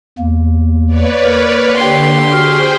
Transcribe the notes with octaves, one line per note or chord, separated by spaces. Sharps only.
E2 A#3
B4 C#5 D5
A#3 A#4
D3 A#3 G4 C6
F#4 G#4 C5 G5 F6